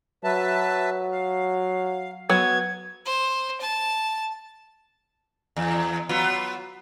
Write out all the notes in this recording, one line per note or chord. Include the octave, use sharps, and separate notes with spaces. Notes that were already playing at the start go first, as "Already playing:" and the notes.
F#3 B4 E5 A5
F5
F#3 B3 G#6
C5
A5
E2
F#3 B3 F4